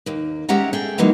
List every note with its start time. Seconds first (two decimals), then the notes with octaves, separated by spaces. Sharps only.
0.06 D#2 A#3
0.49 G#3 C#4 G4 E5 F#5 A#5
0.73 G#4 A4 G5
0.98 E3 F#3 G#3 A#3 D#4